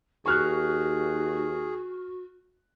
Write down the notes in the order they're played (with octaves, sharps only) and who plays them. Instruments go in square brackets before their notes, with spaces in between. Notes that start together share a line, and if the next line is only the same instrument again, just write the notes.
[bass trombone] D#2 [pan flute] F#4 [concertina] G#4 [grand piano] C#6 F6 F#6